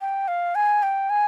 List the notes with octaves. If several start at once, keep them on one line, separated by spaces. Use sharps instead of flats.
G5
F5
G#5
G5
G#5